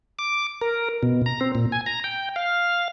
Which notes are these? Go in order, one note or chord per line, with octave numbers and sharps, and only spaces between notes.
D6
A#4
B2
A#5
C4
A#2
G#5
A#5
G5
F5